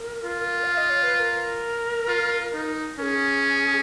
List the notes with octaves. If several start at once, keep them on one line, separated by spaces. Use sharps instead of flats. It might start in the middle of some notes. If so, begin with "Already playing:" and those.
Already playing: A#4
F4
F5
D#5
C#5
B4
B4
A#4
F4
D#4
C#4 G#4 A#4